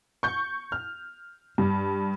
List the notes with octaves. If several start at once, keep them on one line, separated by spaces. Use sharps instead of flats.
C#6 G6
F6
G2